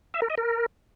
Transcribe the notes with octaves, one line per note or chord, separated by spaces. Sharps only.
E5
A#4
D#5
A#4